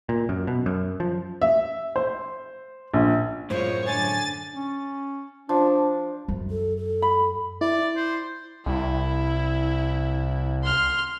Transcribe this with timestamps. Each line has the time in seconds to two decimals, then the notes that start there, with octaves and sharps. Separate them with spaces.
0.09 A#2
0.29 F#2
0.47 B2
0.66 F#2
1.00 F3
1.42 E5
1.96 C5
2.94 A#1
3.50 F#2 A2 G#3 F4 C5 C#5
3.87 D3 D4 G#5 A6
4.56 C#4
5.49 F3 D4
6.28 F#2
6.51 A4
6.77 A4
7.02 B5
7.61 E4 D5
7.96 C5
8.66 C2 E4
10.64 C6 F6